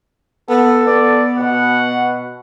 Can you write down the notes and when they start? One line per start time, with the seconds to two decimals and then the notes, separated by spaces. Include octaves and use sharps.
0.49 B3 A4
0.87 B3 D5
1.38 B2 F#5